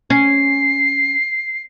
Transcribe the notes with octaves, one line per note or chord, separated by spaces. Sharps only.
C#4 C7